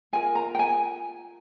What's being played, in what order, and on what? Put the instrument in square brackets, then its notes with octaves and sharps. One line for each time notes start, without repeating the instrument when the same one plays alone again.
[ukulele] F4 A#4 G#5
A#5
G5
G#5